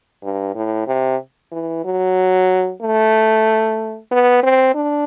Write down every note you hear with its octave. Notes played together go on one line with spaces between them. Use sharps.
G2
A2
C3
E3
F#3
A3
B3
C4
D4